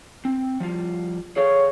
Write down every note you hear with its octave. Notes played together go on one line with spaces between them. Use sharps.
C4
F3 G3 F4
G#4 A4 C#5 F5